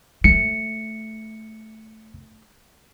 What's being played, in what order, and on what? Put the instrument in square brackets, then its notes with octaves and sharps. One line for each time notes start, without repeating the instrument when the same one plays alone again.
[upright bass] A3 [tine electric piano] C#7